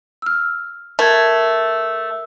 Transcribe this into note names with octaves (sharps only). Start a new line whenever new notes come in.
E6 F6
A3 A#4 G#6